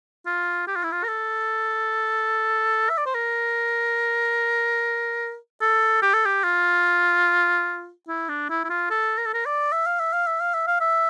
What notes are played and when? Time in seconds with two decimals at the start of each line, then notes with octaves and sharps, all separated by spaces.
0.26 F4
0.67 G4
0.76 F4
0.83 E4
0.92 F4
1.04 A#4
1.08 A4
2.89 E5
2.97 D5
3.06 C5
3.14 A#4
5.61 A4
6.02 G4
6.14 A4
6.25 G4
6.44 F4
8.08 E4
8.29 D4
8.50 E4
8.64 E4
8.69 F4
8.90 A4
9.18 A#4
9.26 A4
9.34 A#4
9.46 D5
9.72 E5
9.86 F5
10.00 E5
10.13 F5
10.27 E5
10.40 F5
10.54 E5
10.67 F5
10.80 E5